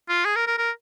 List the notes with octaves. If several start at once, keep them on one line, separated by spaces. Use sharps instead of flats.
F4
G#4
A#4
A#4
A#4